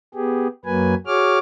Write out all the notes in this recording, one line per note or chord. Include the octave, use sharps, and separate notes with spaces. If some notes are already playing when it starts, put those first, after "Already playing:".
B3 G4 G#4
F#2 F#3 A#3 B4 G#5
F#4 G#4 C#5 D6 F6